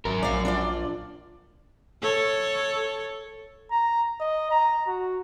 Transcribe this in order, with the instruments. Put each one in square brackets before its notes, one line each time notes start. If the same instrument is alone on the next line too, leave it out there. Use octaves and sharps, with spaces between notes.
[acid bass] G#1 [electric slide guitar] F#2 A#4
[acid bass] A#1 [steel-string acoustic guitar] D5 F5
[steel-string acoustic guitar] D4 F4 D5
[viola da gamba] A4 C#5
[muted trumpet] A#5
D#5
A#5
F#4